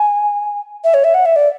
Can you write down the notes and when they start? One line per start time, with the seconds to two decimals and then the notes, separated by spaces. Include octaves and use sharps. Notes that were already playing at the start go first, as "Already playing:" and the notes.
Already playing: G#5
0.84 E5
0.94 C#5
1.04 E5
1.14 F#5
1.26 E5
1.36 D5